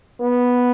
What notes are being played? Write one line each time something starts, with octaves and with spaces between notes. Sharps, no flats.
B3